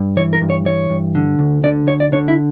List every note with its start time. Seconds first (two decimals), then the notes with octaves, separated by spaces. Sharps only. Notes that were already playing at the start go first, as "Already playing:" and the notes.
Already playing: G2
0.17 E3 C#5
0.33 A#4
0.41 G2
0.50 C#5
0.65 E3 C#5
0.90 G2
1.15 D3
1.39 D2
1.64 D3 D5
1.88 D2 C#5
2.00 D5
2.12 D3 C#5
2.28 E4